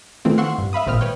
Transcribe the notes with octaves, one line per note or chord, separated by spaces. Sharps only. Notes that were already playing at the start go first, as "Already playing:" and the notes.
D#3 E3 A3 C4 F4
F5 F#5 C6 C#6 E6 F#6
G2
E5 F5 B5 D#6
G#1 A#2 C4 D#5 F6
B4 C#5 G5